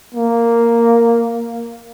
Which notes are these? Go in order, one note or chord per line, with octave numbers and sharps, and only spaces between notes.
A#3